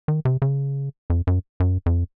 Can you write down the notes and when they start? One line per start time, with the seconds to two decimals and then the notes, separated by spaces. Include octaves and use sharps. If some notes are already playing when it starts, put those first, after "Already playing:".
0.08 D#3
0.25 C3
0.42 C#3
1.10 F2
1.27 F#2
1.60 F#2
1.86 F2